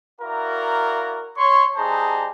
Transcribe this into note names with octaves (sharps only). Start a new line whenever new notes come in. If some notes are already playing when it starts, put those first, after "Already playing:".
E4 F#4 A#4 D5 F5 A#5
C#5 C6 C#6
G3 D#4 G#4 C5 A5 A#5